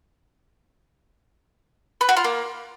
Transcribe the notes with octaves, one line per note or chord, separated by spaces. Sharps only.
B4
F#4
F4
A#3